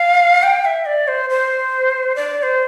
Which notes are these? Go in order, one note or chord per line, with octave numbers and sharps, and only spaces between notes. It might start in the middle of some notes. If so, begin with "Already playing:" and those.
Already playing: F5
G5
E5
D5
C5
C5
D5
D5
C5